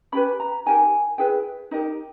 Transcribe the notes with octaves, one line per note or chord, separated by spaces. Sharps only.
C#4 G4 B4 B5
A#5
D#4 G4 A#4 G#5
E4 G#4 B4 G5
D#4 G4 A#4 D#5